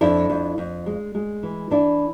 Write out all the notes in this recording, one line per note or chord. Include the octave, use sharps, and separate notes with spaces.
F2 D4 E4
F2
F2
G#3
G#3
E3
E3 D4 E4